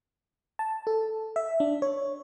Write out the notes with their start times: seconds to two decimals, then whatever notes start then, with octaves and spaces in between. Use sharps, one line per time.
0.59 A5
0.87 A4
1.36 E5
1.60 D4
1.82 C#5